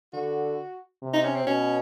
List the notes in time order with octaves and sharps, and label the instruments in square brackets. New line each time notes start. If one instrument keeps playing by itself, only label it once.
[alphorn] D3 [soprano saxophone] F#4
[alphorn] C3
[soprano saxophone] D#4
C#4
C4
[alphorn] B2 [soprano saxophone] C#4